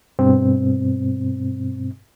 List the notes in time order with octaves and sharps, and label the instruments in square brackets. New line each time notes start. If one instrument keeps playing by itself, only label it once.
[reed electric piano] G2 B2 C4